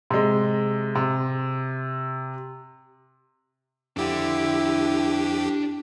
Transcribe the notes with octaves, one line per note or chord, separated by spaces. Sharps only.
C3 G#3
C3
F2 D4 E4 G4 F#5